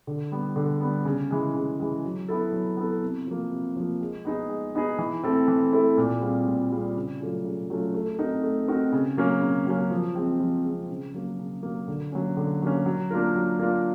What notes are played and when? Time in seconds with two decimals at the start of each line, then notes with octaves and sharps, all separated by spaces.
0.07 D3
0.32 G3 B3
0.56 D3
0.81 G3 B3
1.05 C#3
1.31 E3 G#3
1.55 C#3
1.80 E3 G#3
2.04 F#3
2.28 B3 E4 A4
2.53 F#3
2.77 B3 E4 A4
3.02 C3
3.27 F3 A#3
3.52 C3
3.76 F3 A#3
4.01 G#3
4.25 B3 D#4 G#4
4.50 G#3
4.75 B3 D#4 G#4
4.99 E3
5.24 A3 C4 E4 A4
5.48 E3
5.73 A3 C4 E4 A4
5.97 A#2
6.22 G3 C4 F4 G#4
6.47 A#2
6.71 G3 C4 F4 G#4
6.96 C#3
7.21 F#3 A3 C#4 F4
7.45 C#3
7.70 F#3 A3 C#4 F4
7.94 A3
8.19 C4 D#4 F#4 A#4
8.43 A3
8.68 C4 D#4 F#4 A#4
8.92 C#3
9.17 F#3 A#3 C#4
9.42 C#3
9.66 F#3 A#3 C#4
9.91 F3
10.15 G#3 C4
10.40 F3
10.65 G#3 C4
10.90 C#3
11.14 F#3 A#3
11.39 C#3
11.63 F#3 A#3
11.88 D3
12.12 F#3 A#3 C#4
12.37 D3
12.62 F#3 A#3 C#4
12.86 F#3
13.11 A#3 D4 F4 A#4
13.35 F#3
13.59 A#3 D4 F4 A#4